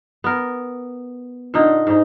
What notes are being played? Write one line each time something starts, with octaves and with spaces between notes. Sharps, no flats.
B3 A#4
A#2 D3 D#4
G#2 D#4